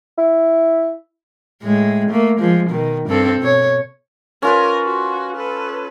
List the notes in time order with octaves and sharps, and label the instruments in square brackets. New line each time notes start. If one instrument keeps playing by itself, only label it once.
[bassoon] E4
[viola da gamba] A2 G#3
A3 A#3
F3 G#3
B2 D#3
G2 C4 A4
B2 C#5
[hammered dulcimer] C#4 F4 B4 [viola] A#4
[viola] F#4
A4 B4